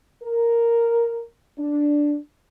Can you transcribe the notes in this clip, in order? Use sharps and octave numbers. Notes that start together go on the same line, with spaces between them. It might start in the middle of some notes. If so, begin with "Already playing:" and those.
A#4
D4